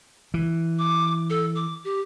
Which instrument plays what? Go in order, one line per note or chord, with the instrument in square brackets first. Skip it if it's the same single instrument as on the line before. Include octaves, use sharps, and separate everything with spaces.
[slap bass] E3
[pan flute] D6
A4
D6
G4